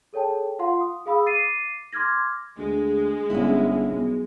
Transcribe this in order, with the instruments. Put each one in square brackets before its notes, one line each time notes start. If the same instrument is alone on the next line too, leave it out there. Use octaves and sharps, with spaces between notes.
[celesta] G#4 A4 C#5 G5 A5
F4 F5 F#5 C6
D#6
G#4 F5 B5 D#6 E6
D6 A6 C7 D#7
C6 D6 F6 G#6 A#6
[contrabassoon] D2 [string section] G#3
[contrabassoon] G1 [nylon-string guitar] C#4 E4
[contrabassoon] B1